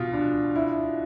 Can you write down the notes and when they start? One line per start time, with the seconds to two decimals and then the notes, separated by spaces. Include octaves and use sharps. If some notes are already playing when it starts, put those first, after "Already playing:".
Already playing: B2 F4
0.13 D4
0.56 E4